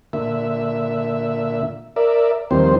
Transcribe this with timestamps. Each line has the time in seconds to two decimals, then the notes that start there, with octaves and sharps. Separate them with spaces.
0.13 A#2 D3 E5
1.96 A#4 D5 E5
2.51 D#2 D#3 F3 G3 C4 C5